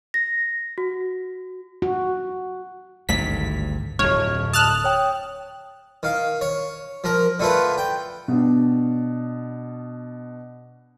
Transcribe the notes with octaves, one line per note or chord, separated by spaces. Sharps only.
A#6
F#4
F#4
G#1 D2 G2 B6
D1 F2 C#5 F6
A5 D#6 F6 F#6
C#5 G5 D#6
D#3 F5
C#5
F3 A#4
D3 A3 F4 B4
G5
B2 D4